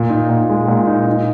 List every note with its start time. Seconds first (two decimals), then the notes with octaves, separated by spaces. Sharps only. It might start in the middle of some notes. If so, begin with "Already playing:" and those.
Already playing: A#2
0.10 D#4
0.30 A#2
0.49 G#3
0.68 A#2
0.87 D#4
1.06 D#4